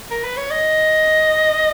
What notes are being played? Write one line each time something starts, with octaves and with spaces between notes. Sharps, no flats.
A#4
B4
C#5
D#5